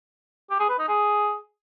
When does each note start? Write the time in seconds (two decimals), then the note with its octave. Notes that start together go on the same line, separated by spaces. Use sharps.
0.50 G4
0.60 G#4
0.69 B4
0.79 D#4
0.88 G#4